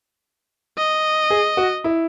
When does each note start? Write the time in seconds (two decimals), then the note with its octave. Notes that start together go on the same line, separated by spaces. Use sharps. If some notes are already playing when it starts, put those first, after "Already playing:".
0.78 D#5
1.30 G#4
1.57 F#4
1.84 E4